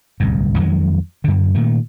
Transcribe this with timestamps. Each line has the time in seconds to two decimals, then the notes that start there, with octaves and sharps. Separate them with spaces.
0.20 D1 C2 G2
0.58 F2 D#3 F#3 G#3
1.24 F#2 D3
1.55 A#2 D#3 A3